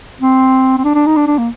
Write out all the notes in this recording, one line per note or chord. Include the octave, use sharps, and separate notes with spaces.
C4
C4
D4
D4
D#4
D4
D4
A#3